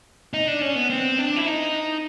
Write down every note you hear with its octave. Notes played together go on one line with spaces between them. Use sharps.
D#4
D4
C#4
B3
C4
D4
E4
D#4